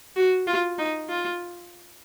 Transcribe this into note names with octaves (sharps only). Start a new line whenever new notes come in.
F#4
F4
D#4
F4